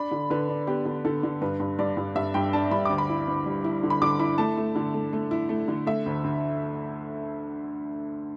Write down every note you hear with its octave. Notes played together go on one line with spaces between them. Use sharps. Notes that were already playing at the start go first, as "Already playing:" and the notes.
Already playing: D4 B5
D3
D3 B4
D4
B3 G4
D3
D3 A4
D3
G2 B4
G2
G2 D5
G2
G2 E5
G2 G5
D4 A5
G2 B5
D2 D6
B5
E4
D2
G3
E4
D3
B5
D3 D6
E4 B5
A3 A5
A3
D3
A3
A3
E4
A3
D3
A3 E5
D2
D2